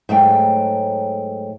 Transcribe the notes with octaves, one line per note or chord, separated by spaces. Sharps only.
G#2 F#3 A3 G5